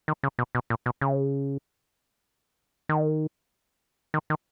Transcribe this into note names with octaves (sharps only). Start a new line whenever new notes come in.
D#3
C#3
B2
B2
A#2
B2
C#3
D#3
D#3
D#3